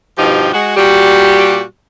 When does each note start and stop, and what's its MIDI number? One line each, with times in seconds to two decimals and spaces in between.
0.18 0.52 43
0.18 0.52 47
0.18 0.52 53
0.18 0.52 63
0.18 0.52 67
0.53 0.74 56
0.53 0.74 66
0.76 1.63 46
0.76 1.63 55
0.76 1.63 66
0.76 1.63 67